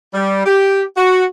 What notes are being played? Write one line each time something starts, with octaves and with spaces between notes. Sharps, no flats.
G3
G4
F#4